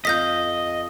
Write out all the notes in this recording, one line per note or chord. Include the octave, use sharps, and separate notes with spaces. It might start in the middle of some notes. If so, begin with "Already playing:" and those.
F2 D#5 F5 D#6 G6 A#6 B6